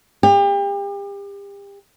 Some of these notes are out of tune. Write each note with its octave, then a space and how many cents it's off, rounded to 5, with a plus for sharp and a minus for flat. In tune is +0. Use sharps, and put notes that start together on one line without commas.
G4 +35